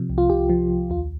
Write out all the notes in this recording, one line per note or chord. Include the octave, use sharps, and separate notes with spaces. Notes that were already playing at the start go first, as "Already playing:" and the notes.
Already playing: C3 F3
C2
F4
C2 G4
F3
C2
D#2 F4